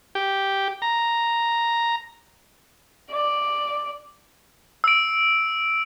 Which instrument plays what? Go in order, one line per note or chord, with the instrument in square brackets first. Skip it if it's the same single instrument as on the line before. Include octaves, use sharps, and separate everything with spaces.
[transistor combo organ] G4
A#5
[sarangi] D5
[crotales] E6 D7